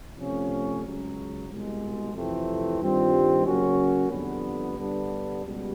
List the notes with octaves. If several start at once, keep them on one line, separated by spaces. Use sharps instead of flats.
C3 F3 A3 C#4
C#2 C#3 F#3
C2 B2 G#3
F2 C3 E3 A3 C4
G2 D#3 G3 C4 F4
C#3 F#3 A#3 C#4 F#4
F2 D3 G3 B3
G2 D3 G3 B3 D4
C#2 B2 G3